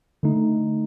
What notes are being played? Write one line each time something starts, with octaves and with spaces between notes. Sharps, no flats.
D3 A3 D#4